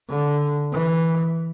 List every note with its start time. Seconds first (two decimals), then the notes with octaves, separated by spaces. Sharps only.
0.09 D3
0.72 E3